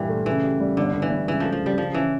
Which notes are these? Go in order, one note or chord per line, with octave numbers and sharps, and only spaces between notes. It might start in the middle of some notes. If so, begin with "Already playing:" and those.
Already playing: G2 A#2 E3 G4
A3
C#3 E3
G4
G3
G1 D3
G1
E3
G2
C#2 E3
F3 A3
F3
C#3
G3
C#3 F3
E3 C#4